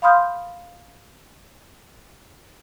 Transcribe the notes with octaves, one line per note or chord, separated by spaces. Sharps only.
F5 B5 C6 D#6 F6 G6